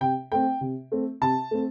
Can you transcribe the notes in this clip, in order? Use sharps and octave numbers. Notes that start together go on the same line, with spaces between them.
C3 G5
A3 C4 G5
C3
A3 C4
C3 A5
A3 C4